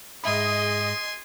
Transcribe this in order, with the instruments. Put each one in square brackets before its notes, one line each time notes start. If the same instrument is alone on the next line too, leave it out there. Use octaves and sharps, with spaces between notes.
[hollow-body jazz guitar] G#2 E5 B5 [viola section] G#4 D#5 [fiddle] G#5 C6